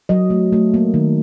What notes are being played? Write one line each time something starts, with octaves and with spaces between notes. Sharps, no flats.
F#3 D#5
A3
A3
A#3
D#3